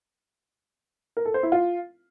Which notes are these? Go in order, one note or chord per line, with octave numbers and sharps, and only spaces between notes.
A#4
A4
C5
E4
F4